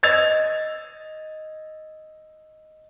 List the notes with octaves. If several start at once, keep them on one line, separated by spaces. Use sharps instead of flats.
D#5 E6 G#6 A6 F7